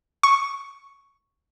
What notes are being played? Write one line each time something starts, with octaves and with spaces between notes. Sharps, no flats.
C#6